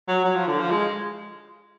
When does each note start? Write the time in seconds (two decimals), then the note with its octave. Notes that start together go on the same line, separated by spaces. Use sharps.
0.08 F#3
0.24 F#3
0.35 F3
0.47 D3
0.59 F3
0.71 G#3